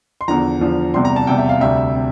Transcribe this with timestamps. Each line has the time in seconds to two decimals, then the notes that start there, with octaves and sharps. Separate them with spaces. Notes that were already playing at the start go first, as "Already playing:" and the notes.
0.21 C6
0.28 E2 D3 F3 A#5
0.61 E2 D3 F3
0.94 E2 C3 G3 C6
1.05 A#5
1.16 A5
1.27 E2 C3 G3 G5
1.38 E5
1.49 F5
1.61 D2 C3 G3 E5
1.95 C3